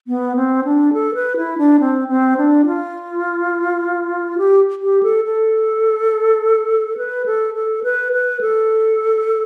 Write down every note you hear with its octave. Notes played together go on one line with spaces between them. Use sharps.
B3
C4
D4
A4
B4
E4
D4
C4
C4
D4
F4
G4
G4
A4
A4
B4
A4
A4
B4
B4
A4